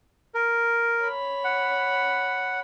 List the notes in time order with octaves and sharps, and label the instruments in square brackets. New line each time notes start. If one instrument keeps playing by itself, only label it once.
[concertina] A#4
[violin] C#5 B5
[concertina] F#5